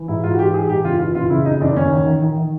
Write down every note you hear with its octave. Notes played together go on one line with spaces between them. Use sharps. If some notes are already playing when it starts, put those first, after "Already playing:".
Already playing: E3
G#2 E4
G#2 F4
F#4
E3 G4
E3 G#4
G#2 G4
F#1 F4
E3 F4
F#1 F4
C#3 E4
F2 D#4
F#1 D4
D#2 C#4
D#3
D#3
D#3
D#3